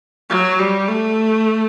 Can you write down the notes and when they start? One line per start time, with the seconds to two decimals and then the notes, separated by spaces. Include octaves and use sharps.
0.30 F#3
0.59 G3
0.88 A3